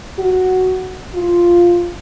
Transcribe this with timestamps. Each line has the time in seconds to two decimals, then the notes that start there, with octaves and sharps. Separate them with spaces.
0.18 F#4
1.14 F4